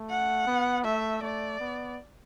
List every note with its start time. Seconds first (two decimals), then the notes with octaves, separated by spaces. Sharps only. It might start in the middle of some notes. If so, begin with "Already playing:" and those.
Already playing: A3
0.10 F#5
0.47 B3
0.84 A3 E5
1.22 A3 D5
1.60 B3